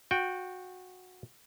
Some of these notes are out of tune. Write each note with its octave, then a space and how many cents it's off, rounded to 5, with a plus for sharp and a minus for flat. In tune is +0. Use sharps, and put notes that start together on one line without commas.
F#4 -20 G5 +0